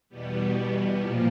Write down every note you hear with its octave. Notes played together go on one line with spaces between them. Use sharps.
E2 B2 G3 B3
A#2 F3 A#3